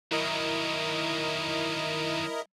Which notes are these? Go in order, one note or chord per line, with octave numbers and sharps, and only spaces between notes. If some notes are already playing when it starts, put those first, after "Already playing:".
D#3 F#3 E4 A#4 D#5